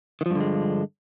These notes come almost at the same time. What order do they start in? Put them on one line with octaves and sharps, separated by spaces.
D#3 F3 G2 D3 G#3